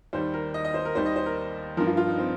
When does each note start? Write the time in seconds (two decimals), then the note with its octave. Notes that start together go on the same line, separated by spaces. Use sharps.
0.13 D#2 D#3 G3 C5
0.34 A#4
0.54 D#5
0.65 D#5
0.74 C5
0.85 A#4
0.95 D#2 D#3 G3 C5
1.06 D#5
1.16 C5
1.26 A#4
1.77 G2 F3 A#4
1.87 F4
1.97 F4
2.08 D#4
2.18 C4